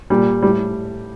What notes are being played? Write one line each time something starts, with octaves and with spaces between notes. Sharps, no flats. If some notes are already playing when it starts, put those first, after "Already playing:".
A#2 G3
A2 G3